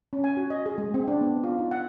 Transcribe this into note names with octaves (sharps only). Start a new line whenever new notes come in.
C#4
G#5
F#4
D#5
G#4
G#3
C4
D4
B3
F4
D#4
F#5